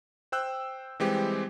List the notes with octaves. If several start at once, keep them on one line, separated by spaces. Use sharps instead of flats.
C5 G5 E6 F#6
E3 G3 G#3 C4 G4 C5